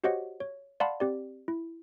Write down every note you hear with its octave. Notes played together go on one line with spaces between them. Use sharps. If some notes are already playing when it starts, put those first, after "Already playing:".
F#4 G4 C5 C#5 D#5 F#5
C#5
D5 F5 F#5 A5 B5 C6
C4 G4 D5
E4